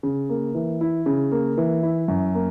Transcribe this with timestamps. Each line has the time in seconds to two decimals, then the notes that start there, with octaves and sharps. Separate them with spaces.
0.03 C#3
0.30 A#3
0.55 E3
0.81 E4
1.06 C#3
1.32 A#3
1.57 E3
1.83 E4
2.08 F#2
2.35 A#3